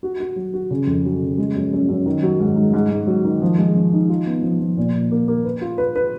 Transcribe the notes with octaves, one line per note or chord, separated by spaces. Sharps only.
F#4
F#4
F#3
F#4
C#3
F2
F#3
C#3
G#3
F#2
F#2
F#2
D#3
F#3
G#2
G#2
G#2
G#2
F#3
D#3
F3
G#3
F3
D#4
F4
B3
F3
F3
A#2
A#2
A#3
A#3
B4
F4
B4
B4